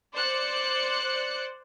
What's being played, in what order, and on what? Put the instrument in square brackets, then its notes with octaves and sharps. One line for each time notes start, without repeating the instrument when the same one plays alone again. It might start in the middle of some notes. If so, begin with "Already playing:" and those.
[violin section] C5 D5 F#6 C#7